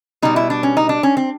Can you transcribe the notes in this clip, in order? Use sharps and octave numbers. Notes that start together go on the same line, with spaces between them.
B2 G3 D#4
E4
D4
C#4
D#4
D4
C#4
C4